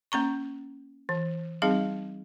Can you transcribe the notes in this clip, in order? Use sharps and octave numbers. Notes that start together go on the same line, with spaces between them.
A#3 C#4 A#5 C#6
E3
G3 C4 D#4 G#4 F5